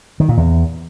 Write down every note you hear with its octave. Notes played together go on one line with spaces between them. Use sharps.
D#3
A#2
E2